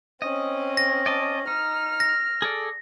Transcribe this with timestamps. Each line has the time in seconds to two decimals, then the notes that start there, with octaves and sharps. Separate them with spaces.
0.22 C4 C#4 D#5
0.77 A#6
1.06 D5 D#5 A5
1.47 D#4 F6
2.00 A#6
2.42 G#4 A4 D5